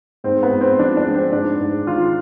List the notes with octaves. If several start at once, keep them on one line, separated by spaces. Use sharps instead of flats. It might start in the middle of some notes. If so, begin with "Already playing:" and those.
G#2 C4
B3
G#2
C4
F3 D4
D4
G#3
C4
G#2 D4
G#2
D#3 F4